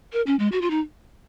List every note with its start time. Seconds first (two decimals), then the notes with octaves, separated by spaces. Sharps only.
0.13 A#4
0.27 C#4
0.39 G#3
0.52 F#4
0.61 F4
0.70 D#4